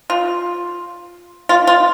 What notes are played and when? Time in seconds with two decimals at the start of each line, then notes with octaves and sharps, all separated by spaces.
0.10 F4
1.49 F4
1.67 F4